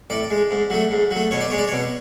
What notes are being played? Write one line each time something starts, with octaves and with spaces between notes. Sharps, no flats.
A2 D5
G#3
G#2
F#3 A3
G#2
F#3 A3
B2 C#5
D5
G#3 C#5
D5
B2 C#5